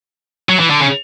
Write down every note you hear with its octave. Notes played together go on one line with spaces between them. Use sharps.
F#3
E3
D3
C#3